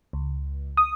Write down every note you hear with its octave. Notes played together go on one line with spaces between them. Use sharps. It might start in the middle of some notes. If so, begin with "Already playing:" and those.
C#2
D#6